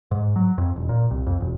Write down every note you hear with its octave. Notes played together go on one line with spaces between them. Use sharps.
G#2
F#3
F2
E1
A#2
C2
F2
E1